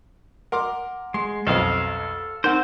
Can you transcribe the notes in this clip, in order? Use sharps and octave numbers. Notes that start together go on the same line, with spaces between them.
A#4 F#5 C6 D6
G#3 C6
B1 F2 A4 F5
C4 D#4 A#4 C5 F#5